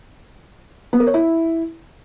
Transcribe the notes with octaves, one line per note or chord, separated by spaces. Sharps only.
B3
A#4
C#5
E4